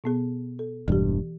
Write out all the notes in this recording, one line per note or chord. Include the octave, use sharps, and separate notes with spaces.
B2 B3 G#4
A4
E1 G2 E3 G4